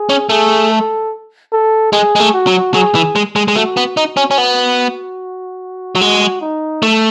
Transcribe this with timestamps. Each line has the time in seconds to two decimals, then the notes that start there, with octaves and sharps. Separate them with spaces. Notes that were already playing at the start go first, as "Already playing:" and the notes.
Already playing: G#4
0.09 C#4
0.29 A3 G#4
0.70 A4
1.53 A4
1.92 G#3 G#4
2.16 G#3
2.20 A3
2.34 F#4
2.47 F#3
2.74 F#3 G#4
2.95 E3
3.16 G#3
3.36 G#3
3.48 G#3
3.56 A3 F#4
3.77 B3
3.97 D#4 F#4
4.17 C#4
4.31 C#4
4.38 B3
5.95 F#3
6.01 G#3 F#4
6.41 D#4
6.83 A3